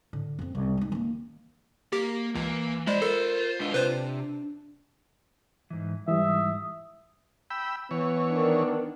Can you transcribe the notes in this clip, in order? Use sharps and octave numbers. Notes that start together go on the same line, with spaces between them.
A2 D3
F2 C4
C2
G#3 D#4
D#3 A#3
A#3 G4
C#2 E3 A#3
G#3 F4 C5 D5 B5
A4 A#4
G#3 D4 B4 D#5
C3 B4 C5
G#2 E3
G#2 E3 G3 E5 D#6
G5 B5 E6
E3 B3 C#5
D#3 D4